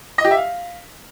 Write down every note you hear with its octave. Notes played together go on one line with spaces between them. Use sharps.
D#5
G4
E5
F5